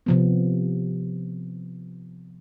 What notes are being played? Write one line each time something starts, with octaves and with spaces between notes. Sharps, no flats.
C3 F3 B3